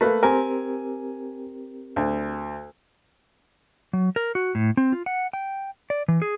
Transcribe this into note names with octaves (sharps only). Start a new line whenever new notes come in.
A3 A#3 B4
C4 G4 A#4 G#5
D2
F#3
A#4
F#4
A2
C4
F4
F#5
G5
D5
E3
G#4